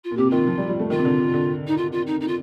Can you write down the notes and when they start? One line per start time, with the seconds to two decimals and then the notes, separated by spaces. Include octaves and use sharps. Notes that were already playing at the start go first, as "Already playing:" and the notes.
0.04 F4
0.11 A#2
0.17 C3 G4
0.30 D#3 F4
0.47 F3
0.58 G3
0.69 G3
0.80 A3
0.90 D#3 F4
0.99 C3
1.05 D3
1.19 C3
1.34 D3
1.67 D#4
1.77 F4
1.92 F4
2.06 D#4
2.20 D#4
2.27 F4